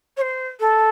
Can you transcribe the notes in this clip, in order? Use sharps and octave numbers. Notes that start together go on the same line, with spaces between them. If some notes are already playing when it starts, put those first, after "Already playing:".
C#5
C5
A4